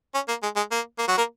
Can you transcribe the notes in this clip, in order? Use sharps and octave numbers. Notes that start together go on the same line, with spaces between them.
C#4
A#3
G#3
G#3
A#3
A#3
F#3 F#4
A#3 A#4